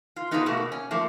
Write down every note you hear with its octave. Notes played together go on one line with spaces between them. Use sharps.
F4
B3 D#4 F4 G#4 A4 B4
B2 A3 A#3 F#4
C#4
F3 A3 A#3